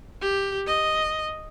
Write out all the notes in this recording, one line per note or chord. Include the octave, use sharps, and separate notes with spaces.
G4
D#5